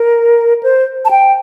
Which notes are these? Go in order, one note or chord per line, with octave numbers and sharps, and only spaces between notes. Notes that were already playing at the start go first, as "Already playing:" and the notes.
Already playing: A#4
C5
A5
G5